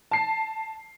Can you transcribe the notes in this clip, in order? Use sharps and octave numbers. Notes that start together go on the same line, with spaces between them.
A5 C7